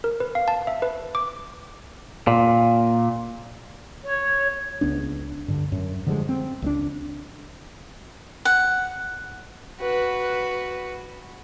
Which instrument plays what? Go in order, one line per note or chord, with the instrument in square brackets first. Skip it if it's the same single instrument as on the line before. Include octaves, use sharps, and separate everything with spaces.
[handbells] A#4
B4
F5
A5
E5
B4
D6
[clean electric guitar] A#2
[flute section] C#5
[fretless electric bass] C#2 B3 D4
G2 D3
F#2
D3 F3 G3 G#3
C4
C#2 A3 D4
[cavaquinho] F#5
[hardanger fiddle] F#4 B4